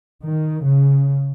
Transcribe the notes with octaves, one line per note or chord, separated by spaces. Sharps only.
D#3
C#3